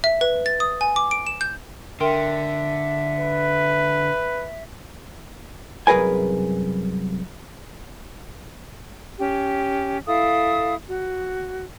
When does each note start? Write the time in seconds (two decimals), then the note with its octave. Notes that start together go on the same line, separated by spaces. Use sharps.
0.04 E5
0.21 B4
0.46 A6
0.60 D#6
0.81 G#5
0.96 D6
1.11 D7
1.26 E7
1.41 G6
2.00 D3 A#4 E5 G5 C6
3.18 B4
5.87 C2 F#2 G#4 A#4 B4 G#5
9.18 C#4 G4
10.07 E4 A4 F5 D#6
10.88 F#4